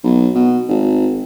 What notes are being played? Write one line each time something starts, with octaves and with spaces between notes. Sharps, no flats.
B1
B2
G#1